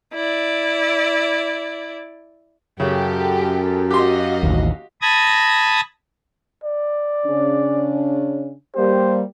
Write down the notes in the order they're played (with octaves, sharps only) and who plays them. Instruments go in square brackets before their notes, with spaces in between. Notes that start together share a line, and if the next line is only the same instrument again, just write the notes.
[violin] E4 D5
[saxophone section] F#2 [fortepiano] C#3 [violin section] G4 A4
[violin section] F#4 D#5 F5 [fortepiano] G4 C6
[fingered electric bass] A1 D#2
[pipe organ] A5 B5 D#6 G#6 A#6
[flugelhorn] D5
[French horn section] C#3 C#4 D4
[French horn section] G3 A#3 G4 [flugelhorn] C5